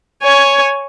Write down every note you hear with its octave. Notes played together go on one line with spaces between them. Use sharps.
C#5 G#5